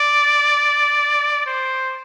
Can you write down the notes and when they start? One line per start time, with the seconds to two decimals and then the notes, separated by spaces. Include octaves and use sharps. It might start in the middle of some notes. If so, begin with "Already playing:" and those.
Already playing: D5
1.46 C5